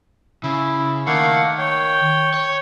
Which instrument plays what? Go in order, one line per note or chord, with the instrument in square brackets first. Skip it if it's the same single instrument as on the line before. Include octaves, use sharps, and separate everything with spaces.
[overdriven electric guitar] C#3 [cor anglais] E4
[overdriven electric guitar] D#3 [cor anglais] A3 [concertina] A#3 F5 F#5
[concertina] C#5 [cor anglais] G5
[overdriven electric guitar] C#5